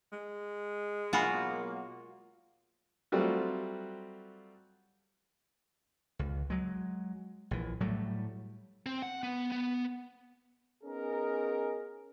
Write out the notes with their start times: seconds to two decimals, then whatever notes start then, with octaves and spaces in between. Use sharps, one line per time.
0.12 G#3
1.13 B2 F#3 A#3 F4 F#4 F#5 G#5 B5
3.12 F#3 G3 A3 C4 F4 F#4
6.19 C#2
6.50 F#3 G#3
7.51 A#1 E3
7.81 A2 F#3 G3 A3
8.86 C4
9.02 F#5
9.23 B3
9.52 B3
10.84 B3 C#4 D#4 G#4 A#4